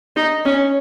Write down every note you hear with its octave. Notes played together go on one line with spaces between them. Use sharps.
D#4
C#4